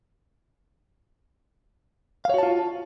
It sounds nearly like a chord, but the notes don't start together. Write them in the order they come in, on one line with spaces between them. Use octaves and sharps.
F5 C#5 F#4 A5 F4